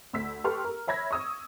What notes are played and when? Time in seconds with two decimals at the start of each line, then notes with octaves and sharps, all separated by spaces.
0.13 D2 E6 B6
0.44 G4 A4 B4 C6 C#6 F6
0.65 A#4
0.87 C#5 E5 B5 G#6 A#6
1.11 C#6 D#6 E6